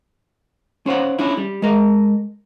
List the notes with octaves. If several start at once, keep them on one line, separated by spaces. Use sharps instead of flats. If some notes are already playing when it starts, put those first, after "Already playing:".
C#4 C5 F5 F#5
C#4 D4 E4
G3
G#3 A#4